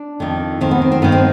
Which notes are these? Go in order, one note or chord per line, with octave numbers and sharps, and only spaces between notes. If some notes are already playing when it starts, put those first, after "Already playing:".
Already playing: D4
F2 D#3
F2 D#3 C4
B3
C4
C4
G2 D#3 B3
C4